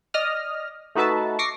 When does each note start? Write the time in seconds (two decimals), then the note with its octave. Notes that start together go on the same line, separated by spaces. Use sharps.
0.14 D5 D#5 D#6 F6 A#6
0.95 A3 D#4 F#4 B4 E5 A5
1.39 C#6 D6 A#6 C7